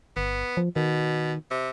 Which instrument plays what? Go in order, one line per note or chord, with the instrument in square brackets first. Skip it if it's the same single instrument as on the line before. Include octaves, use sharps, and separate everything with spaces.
[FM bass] G1 [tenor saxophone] B3
[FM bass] F3
[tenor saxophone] B2 [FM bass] D#3
[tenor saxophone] C3